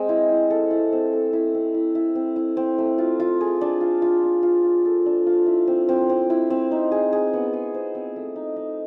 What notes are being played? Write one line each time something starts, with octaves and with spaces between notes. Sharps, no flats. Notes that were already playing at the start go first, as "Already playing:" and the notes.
Already playing: G#3 C4
E4
E4
A4
E4
C4
A4
E4
C4
E4
E4
C4
E4
C4
A3
F4
F4
G#4
D4
F4
F4
D4
F4
F4
A4
D4
F4
E4
C4
C4
C4
E4
C4
D#4
G#4
G#4
B3
G#4
C5
C4
A3
D#4
D#4